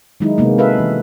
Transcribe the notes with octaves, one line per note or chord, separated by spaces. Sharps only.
D#3 F#3 G#3 D#4 E4
C3 G#3 A#3 B3
F#4 A4 B4 E5 F5
E3